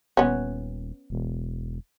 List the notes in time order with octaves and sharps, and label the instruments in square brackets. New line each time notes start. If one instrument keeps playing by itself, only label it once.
[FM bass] D#1 [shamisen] B3 C#4
[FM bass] E1